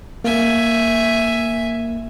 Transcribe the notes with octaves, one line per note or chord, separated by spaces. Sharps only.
A#3 E5 G#5